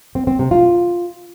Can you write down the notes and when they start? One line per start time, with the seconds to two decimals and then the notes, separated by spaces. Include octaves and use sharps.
0.15 C4
0.27 C4
0.39 C3
0.51 F4